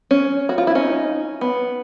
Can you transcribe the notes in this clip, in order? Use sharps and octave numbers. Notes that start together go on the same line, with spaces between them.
C#4
F#4
F4
E4
C#4 D#4
B3